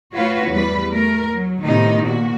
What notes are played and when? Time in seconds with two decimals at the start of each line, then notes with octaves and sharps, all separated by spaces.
0.14 A3 F4 F#4 B4 C#5
0.50 E2 G3 B4
0.92 A3 A#4
1.34 F#3
1.63 A2 C3 D#3 B3 D#4
2.03 A#2 F#4